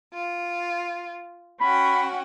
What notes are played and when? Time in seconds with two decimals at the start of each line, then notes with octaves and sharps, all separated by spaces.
0.13 F4
1.61 C#4 F#4 G5 B5